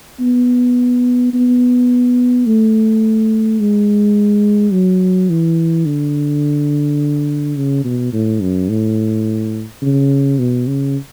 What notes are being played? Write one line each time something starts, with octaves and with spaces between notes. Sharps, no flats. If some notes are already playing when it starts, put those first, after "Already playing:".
B3
B3
A3
G#3
F#3
E3
D3
C#3
B2
A2
F#2
A2
C#3
B2
C#3